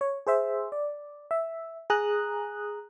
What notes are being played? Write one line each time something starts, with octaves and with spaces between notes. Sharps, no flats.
C#5
G#4 C5 E5
D5
E5
G#4 A#5 D#6 F#6